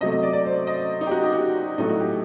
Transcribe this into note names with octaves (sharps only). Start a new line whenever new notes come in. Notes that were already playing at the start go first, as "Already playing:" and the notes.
C3 F#3 A3 D#5
D#5
D5
D5
C5
D#5
D#4
G4
F#4
G4
F#4
A2 F#3 A3 D#4
F#4
G4